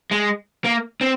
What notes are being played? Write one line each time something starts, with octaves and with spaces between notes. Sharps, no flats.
G#3
A#3
C4